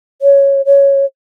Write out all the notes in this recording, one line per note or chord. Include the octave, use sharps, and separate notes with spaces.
C#5
C#5